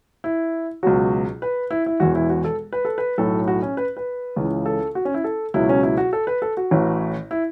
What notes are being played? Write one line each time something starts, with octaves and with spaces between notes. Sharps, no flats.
E4
C#2 B2 F#3 F#4
B4
E4
E4
E1 E2 B2 F#4
E4
F#4
A4
B4
A4
B4
B1 A2 F#3 A4
F#4
C#4
B4
B4
C#2 C#3 E3
A4
F#4
C#4
E4
A4
C#2 B2 F#3 E4
C#4
E4
F#4
A4
B4
A4
F#4
A1 A2 E3
E4